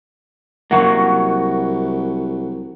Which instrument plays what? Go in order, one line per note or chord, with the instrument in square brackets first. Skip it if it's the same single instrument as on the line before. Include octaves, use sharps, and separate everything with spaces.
[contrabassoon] C2 [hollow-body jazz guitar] F#3 A#3 [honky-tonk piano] F#5 C#6